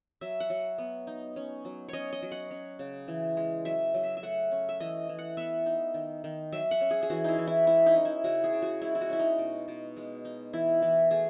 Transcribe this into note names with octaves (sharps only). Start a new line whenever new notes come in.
F#3 E5
F#5
F#3
B3
D#4
C#4
F#3
C#4 C#5 D#5
D#5
F#3
F#5
C#4
C#3
E3
G#3
F#3 E5
F#3
E5
E5
A3 F#5
C#4
E5
E3 D#5
E3
F#5
B3 E5
D#4
D#3
D#3
F#3 E5
F#5
C#4
G#4
G#4
E3 F#4
D#4 E4
E3
E4
G#3 E4
D#4
C#4
E4
C#3 F#4
G#4
C#3
F#4
G#3 E4
E4
F#4
C#4 E4
D#4
B2
B2
G#3
D#4
E3 E4
E3
A3 G#4